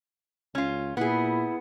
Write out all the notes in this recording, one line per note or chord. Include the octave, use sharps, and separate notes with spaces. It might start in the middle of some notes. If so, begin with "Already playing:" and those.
C#2 C#4 F4
A#2 B3 E4 G#4